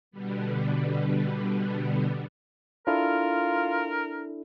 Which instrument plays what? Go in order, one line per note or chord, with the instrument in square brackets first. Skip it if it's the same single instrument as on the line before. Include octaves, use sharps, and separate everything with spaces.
[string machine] B2 D3 G3 B3
[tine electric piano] D4 E4 A4 [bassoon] F4 [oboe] A#4